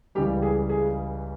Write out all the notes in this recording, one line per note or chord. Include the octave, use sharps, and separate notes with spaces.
C#2 C#3 E3 G3 G4
G#4
G#4